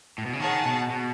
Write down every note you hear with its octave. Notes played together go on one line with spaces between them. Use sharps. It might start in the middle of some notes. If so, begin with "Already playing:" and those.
A2
B2
C#3
D#3 G#4 C#5 F#5 A5
B2
B2